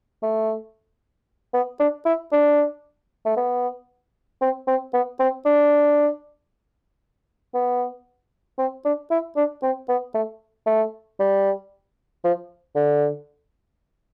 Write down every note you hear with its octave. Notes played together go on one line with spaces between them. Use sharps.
A3
B3
D4
E4
D4
A3
B3
C4
C4
B3
C4
D4
B3
C4
D4
E4
D4
C4
B3
A3
A3
G3
F3
D3